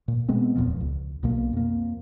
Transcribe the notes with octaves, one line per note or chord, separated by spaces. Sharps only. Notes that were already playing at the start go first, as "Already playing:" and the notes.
A#2
B2 G#3 B3 C4
D1 E2 A#2 F3
C#2
B1 B2 A#3
F2 A#3